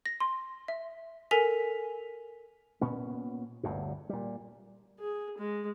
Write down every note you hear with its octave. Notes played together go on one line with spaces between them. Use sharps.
A#6
C6
E5
A4 A#4 G#5 B6 F7
A#2 B3 C#4
G1 D2 G2 A#2
A#2 G3
G#4
G#3